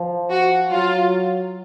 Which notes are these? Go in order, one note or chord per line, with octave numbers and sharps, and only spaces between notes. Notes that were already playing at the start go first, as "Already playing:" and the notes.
Already playing: F3
F#4
F#3 F4